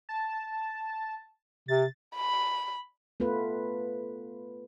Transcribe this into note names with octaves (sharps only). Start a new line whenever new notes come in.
A5
C3 A6
B5
A3 B3 F4 B4